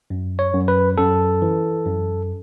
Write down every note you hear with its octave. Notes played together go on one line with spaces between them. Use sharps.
F#2
C#5
F#2
B4
F#2 A4
E3
F#2